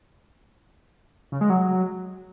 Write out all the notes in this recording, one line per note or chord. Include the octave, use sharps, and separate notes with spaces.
C#3
G#3
F#3